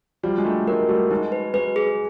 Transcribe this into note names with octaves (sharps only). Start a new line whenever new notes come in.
F3 G3 F#4
G#3
G3 A3 D4
F#3 G#3 A#4
G3 A3 F#4
F#3 G#3 D#4
B4
F#3 G#3 B4
G#4